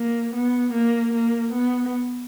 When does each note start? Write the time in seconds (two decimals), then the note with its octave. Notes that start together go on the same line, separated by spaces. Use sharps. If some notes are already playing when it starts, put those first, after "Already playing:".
Already playing: A#3
0.34 B3
0.73 A#3
1.13 A#3
1.53 B3